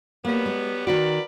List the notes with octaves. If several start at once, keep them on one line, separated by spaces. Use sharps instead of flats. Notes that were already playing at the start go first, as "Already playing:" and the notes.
F#3 G3 A#3 B3
G#3
D#3 F#4 A#4 B4 D5